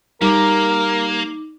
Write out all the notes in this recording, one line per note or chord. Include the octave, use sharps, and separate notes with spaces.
G3 A#3 D#4 A#4 D6